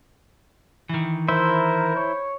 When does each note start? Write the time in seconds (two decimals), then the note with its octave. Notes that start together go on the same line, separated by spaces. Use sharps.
0.89 D#3 E3
1.28 E4 A#4 C5 E5
1.96 C#5